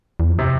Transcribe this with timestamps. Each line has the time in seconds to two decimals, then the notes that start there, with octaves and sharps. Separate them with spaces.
0.20 E2
0.29 F2
0.39 C3